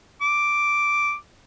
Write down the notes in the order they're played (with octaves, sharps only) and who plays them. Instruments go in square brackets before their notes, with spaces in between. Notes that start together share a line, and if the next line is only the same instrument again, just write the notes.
[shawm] D6